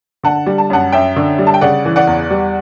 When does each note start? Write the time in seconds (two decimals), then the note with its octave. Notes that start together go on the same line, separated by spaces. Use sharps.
0.24 D3 F#5 A5
0.46 G3
0.58 A5
0.70 F#2 F#5 A5
0.92 F#2 E5 G5
1.16 D3
1.39 G3
1.47 A5
1.54 G5
1.61 C#3 D5 F#5
1.85 E3
1.96 D5 F#5
2.07 E2
2.31 G3